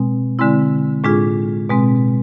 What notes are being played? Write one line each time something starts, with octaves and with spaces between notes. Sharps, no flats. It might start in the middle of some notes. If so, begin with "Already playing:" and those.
Already playing: B2 G#3 C4
D3 G#3 C4 E4
A2 G#3 D4 F4 G#4
B2 G#3 C4